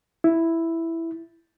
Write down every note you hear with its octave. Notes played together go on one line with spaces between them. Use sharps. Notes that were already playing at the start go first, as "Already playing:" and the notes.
E4